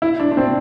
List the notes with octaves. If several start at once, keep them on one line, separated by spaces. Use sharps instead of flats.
E4
D4
D4
C4